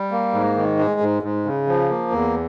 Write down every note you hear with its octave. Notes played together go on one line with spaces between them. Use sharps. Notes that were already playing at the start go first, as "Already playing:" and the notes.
Already playing: G3
A#3
G#2
D#3
G#3
G#2
G#2
C#3
F3
A#3
E2